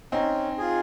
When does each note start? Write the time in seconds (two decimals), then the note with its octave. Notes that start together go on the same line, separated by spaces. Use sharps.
0.12 C4 C#4 D#4
0.58 F4 G#4